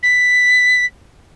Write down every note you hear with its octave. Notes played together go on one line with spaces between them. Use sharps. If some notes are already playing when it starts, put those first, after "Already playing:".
B6